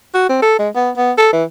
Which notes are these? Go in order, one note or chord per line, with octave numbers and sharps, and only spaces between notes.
F#4
C4
A4
G#3
B3
B3
A4
E3